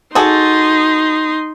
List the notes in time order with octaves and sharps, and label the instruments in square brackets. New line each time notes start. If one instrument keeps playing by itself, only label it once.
[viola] D#4 C6 [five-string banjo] F#4 G#4 A4